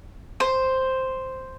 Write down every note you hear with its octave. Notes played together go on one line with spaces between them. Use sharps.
C5